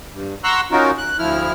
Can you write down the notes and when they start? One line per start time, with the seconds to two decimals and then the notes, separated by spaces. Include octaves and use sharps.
0.13 G2
0.44 F#5 A#5 C6 C#6 E6 F#6
0.71 C#4 D#4 F4 F#4 A#4
0.98 F#6
1.19 D2 F3 E4 F6